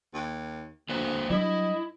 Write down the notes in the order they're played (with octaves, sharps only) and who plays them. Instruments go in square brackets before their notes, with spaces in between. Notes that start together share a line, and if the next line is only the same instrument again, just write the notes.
[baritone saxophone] D#2
[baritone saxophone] D2 [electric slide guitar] A#3 B4 C5
[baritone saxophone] G2 [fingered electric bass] F#3 G3 [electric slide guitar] E4 [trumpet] D#5